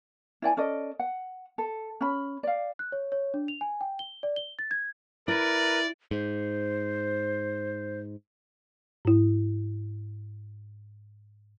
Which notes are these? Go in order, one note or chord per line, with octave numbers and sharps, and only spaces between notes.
E4 D5 G5 G#5
C#4 A4 D5 D#5
F#5
A4
C#4 B5
D5 F5
F#6
C#5
C#5
D4
F7
G#5
G5
G7
D5
G7
A6
G#6
E4 A#4 B4 D5
G#2 C5
G#2 E4